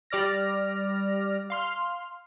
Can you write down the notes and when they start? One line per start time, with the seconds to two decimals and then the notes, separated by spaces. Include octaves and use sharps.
0.10 G3 D5 F6 A#6
1.50 F5 C6 F6